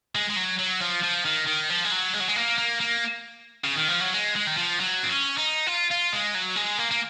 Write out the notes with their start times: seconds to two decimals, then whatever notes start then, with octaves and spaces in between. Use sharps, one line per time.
0.15 G#3
0.30 G#3
0.36 F#3
0.59 F#3
0.81 F3
1.03 F3
1.25 D#3
1.47 D#3
1.70 F3
1.85 G#3
1.92 F#3
2.14 G#3
2.20 F#3
2.28 G#3
2.36 A#3
2.59 A#3
2.81 A#3
3.64 C#3
3.76 D#3
3.88 F3
4.00 F#3
4.14 G#3
4.36 G#3
4.47 D#3
4.57 F3
4.80 F#3
5.03 C4
5.09 C#4
5.38 D#4
5.67 F4
5.91 F4
6.13 G#3
6.35 F#3
6.56 G#3
6.78 A#3
6.91 A#3